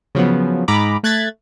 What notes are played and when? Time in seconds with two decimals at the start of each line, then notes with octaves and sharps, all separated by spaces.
0.15 C#3 F3 F#3 B3
0.68 G#2 A#5 B5 D6
1.03 A3 F#6 G#6 A6 B6